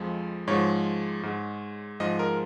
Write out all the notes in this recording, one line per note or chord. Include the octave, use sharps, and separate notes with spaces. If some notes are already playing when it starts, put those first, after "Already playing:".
Already playing: F2 F3 G#3
G#2 F3 G#3 C#5
G#2 G#3
G#2 F3 G#3 D#5
A#4